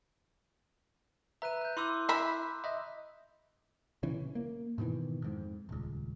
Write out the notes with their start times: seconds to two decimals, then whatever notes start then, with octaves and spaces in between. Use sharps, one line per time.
1.42 B4 E5 A#5 F#6 D#7
1.61 F#6 G6
1.77 E4 C6 D6 E6
2.09 E5 B5
2.64 D#5 E5
4.03 A#1 C#3 E3 C#4
4.35 A#3
4.78 G#2 B2 D#3 E3
5.22 F2 G#2
5.69 D#1 C#2